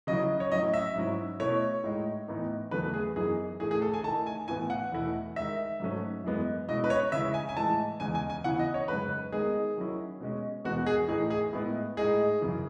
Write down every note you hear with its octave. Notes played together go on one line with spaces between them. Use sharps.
C#3 F#3 C#4 E4 D#5
C#5
A2 F#3 C#4 E4 D#5
E5
G#2 F#3 C#4 E4
B2 A3 E4 C#5
A2 G#3 D#4
A2 E3 B3 D#4
E2 C#3 F#3 A3 B4
G#4
F#2 E3 B3 D#4 G#4
A2 E3 A3 G#4
G#4
A4
G#5
D#3 A3 E4 A5
G#5
A2 E3 B3 E4 G#5
F#5
E2 B2 A3 E4
D#3 G#3 D#4 E5
G#2 F#3 A3 C#4
F#2 E3 G#3 B3
B2 G#3 C#4 E4 D#5
B4
C#5
C#3 G#3 C#4 E4 E5
G#5
G#5
A2 E3 G#3 A5
E2 C#3 G#3 G#5
G#5
G#5
C#3 E3 B3 E4 F#5
D#5
C#5
F#2 C#3 G#3 D#4 B4
D#3 G#3 B3 D#4 G#4
D#3 F#3 C#4 E4
B2 G#3 C#4
E2 B2 G#3 B3 F#4
G#4
A2 E3 A3 D#4 G#4
G#4
A2 G#3 B3 E4
A2 G#3 D#4 G#4
F#2 C#3 E3